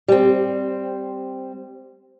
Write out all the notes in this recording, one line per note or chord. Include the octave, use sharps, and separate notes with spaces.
G3 C4